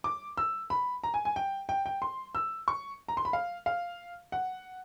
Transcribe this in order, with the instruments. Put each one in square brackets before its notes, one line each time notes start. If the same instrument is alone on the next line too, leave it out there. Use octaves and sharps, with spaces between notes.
[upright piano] D6
E6
B5
A#5
G#5
G#5
G5
G5
G5
C6
E6
C#6
A#5
C6
B5
F5
F5
F#5